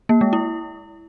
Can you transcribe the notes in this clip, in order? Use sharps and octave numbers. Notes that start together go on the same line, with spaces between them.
A#3
G#3
E4